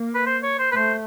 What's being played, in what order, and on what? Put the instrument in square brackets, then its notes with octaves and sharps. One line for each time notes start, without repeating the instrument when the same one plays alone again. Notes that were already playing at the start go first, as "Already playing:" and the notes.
Already playing: [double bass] A#3
[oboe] B4
C5
C#5
C5
B4
[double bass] A3 [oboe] C5